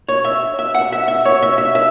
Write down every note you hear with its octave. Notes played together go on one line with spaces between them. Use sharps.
C#5
E5
E5
F#5
E5
E5
C#5
E5
E5
E5